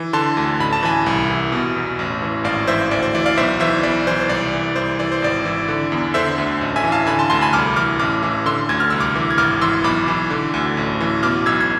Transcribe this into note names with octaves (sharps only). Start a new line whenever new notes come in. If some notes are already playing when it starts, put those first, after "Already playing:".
Already playing: E3
D3 A5 C6
D2
A1 B5
A5
E3 G#5 B5
C2
E3
B2
E2
A1
E3
G#1 D5 F5
E3 C5 E5
D2 D5
C5
E3 D5
D5 F5
B1 C5 E5
E3 C5 E5
B1 D5
E3 C5
C5
C2 D5
E3
C2 C5
E3 D5
C5
G#1 D5
E3
D3
E2
D3 C5 E5
D2
A1
E5 G#5
E3
F5 A5
D3 G#5 B5
A5 C6
D2 A5 C6
G#5 B5
C2 D6 F6
E3 D6 F6
A1 D6 F6
E3
D3 C6 E6
D2 G#6
F6
C2 E6
D6 F6
E3
G#6
G#1 D6 F6
E3 C6 E6
B1 B5 D6
E3
D3
D2
A1
E3
B2 D6 F6
B1 E6 G#6
G#6